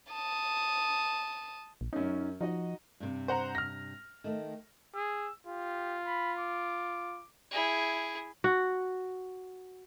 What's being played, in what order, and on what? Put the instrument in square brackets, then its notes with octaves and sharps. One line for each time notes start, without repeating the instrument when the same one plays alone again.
[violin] A5 D#6
[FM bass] A#1
[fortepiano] F#2 C#4 [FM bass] D#4
[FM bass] F3 [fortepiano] D#4 F#4 D#5
[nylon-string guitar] G2 C3
[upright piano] C5 F#5 A#5
F6 A#6
[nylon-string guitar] D#3 A3
[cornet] G#4 [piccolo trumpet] E6
[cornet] F4 [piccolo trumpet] G4
[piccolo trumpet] B5
D6
[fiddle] E4 G#4
[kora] F#4